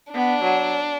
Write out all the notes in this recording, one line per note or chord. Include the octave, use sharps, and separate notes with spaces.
B3 D4
F#3